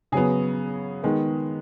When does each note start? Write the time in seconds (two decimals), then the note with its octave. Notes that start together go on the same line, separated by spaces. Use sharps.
0.12 C#3 F#3 B3 G#4
1.03 D#3 G#3 B3